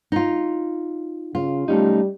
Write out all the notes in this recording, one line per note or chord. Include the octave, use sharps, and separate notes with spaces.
D#4 F4
C#3 F4
G3 A3 C#4 D#4